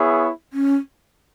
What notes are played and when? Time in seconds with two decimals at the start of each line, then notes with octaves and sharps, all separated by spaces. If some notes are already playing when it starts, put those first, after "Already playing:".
Already playing: B3 E4 G#4 C#5 E5
0.53 C#4